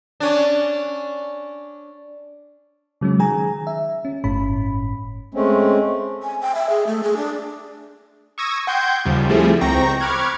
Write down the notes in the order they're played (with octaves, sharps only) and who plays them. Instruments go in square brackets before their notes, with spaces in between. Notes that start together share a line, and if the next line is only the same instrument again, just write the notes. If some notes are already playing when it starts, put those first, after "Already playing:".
[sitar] C#4 D4
[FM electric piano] C#3 F#3 G#3 C#4
D#3 G#4 G#5 A#5
E5
C#4
G1 A2 C#4 B5
[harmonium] G#3 A3 C4 C#4
[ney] G#5
G5
E5
G#4
A3
G#4
D4
[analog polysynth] C#6 D#6 E6 G#6 A#6
F#5 G5 C6 G6 G#6
D#2 C#3 F3 G3
F3 G3 A3 C4 E4 G#4
C#2 C4 G5 A#5 C#6 A#6
B5 C#6 D6 F6 F#6 G#6